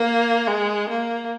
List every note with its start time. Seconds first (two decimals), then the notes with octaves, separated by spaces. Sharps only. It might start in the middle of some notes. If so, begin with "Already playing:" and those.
Already playing: A#3
0.47 G#3
0.89 A#3